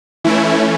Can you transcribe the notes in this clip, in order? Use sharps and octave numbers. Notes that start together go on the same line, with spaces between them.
E3 A3 C#4 E4